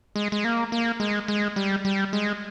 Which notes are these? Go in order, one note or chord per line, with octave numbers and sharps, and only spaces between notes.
G#3
G#3
A#3
A#3
G#3
G#3
G3
G3
G#3